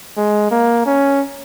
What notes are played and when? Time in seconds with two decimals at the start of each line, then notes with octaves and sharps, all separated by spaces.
0.17 G#3
0.51 A#3
0.86 C#4